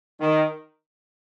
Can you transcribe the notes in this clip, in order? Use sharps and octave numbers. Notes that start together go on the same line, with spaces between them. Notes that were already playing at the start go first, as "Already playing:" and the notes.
D#3